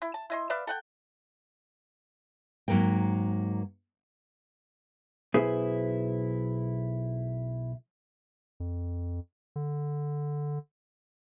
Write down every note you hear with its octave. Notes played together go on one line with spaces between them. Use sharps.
E4
A5
E4 D#5 C6
B4 D5 E5 F5
A4 F#5 G5
G#2 F#3 A#3 A#4 G5
B1 E4 G#4 B4 C5
F2
D3